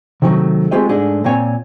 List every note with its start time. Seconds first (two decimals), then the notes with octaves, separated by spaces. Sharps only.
0.22 C3 D#3 F#3 A3
0.71 G#3 A3 C4 F4 G4 D#5
0.89 G#2 G#3 A3 D4 G#4
1.24 A#2 A#3 C4 C#5 G#5